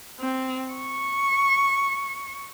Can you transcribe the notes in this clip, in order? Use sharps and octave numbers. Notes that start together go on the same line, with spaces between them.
C4
C#6